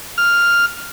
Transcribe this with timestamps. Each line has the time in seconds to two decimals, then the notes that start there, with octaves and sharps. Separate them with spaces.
0.18 F6